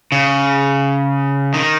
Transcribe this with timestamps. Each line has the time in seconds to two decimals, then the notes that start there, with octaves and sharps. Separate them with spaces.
0.12 C#3
1.54 D#3